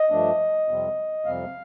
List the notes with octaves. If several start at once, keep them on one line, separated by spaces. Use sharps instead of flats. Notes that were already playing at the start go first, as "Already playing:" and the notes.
Already playing: D#5
G2 F3 A3 D4
F2 C3 G3 C4
F2 C3 G3 C4 F5